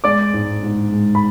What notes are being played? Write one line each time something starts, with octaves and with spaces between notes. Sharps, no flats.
G#3 D5 D6
G#2
G#2
G#3
B5